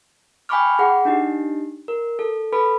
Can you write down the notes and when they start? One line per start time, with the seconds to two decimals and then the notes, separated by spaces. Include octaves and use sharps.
0.49 G5 G#5 B5 C#6 D6 F6
0.79 G#4 F#5
1.05 D4 D#4 G4
1.88 A#4
2.19 A4
2.53 A4 B4 B5